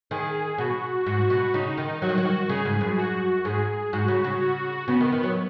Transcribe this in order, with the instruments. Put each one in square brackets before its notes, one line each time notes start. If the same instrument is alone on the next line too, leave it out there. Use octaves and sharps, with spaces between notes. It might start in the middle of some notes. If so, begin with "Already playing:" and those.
[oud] D#3 [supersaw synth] G#4
[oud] B2 [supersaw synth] F#4
[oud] G#2 [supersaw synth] F#4
[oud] B2
[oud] C#3 [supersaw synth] D#4
[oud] D#3
[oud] F#3 [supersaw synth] F#4
[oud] D#3
F#3
D#3
[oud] C#3 [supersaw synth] G#4
[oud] G#2
F#2
[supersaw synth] F#4
[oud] G#2 [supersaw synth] G#4
[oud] G#2 [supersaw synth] F#4
[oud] C#3
C#3
[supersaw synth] F#4
[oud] C#3 [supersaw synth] B3
[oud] D#3
D#3
F#3